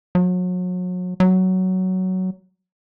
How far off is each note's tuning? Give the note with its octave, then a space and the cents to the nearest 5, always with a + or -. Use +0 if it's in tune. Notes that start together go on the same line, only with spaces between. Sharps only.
F#3 -35
F#3 +10